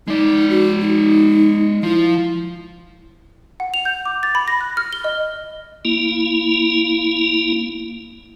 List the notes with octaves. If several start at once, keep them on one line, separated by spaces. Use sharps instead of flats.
G#3 D#4 D5
F#4
D#4
F3 E4
F#5
F7
G6
D6
A6
B5
A#6
F#6
F6
G7
D#5
A#3 E4